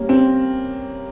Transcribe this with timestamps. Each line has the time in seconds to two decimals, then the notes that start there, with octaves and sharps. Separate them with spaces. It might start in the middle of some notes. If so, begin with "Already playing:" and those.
Already playing: G3 A#3 C#4
0.09 C4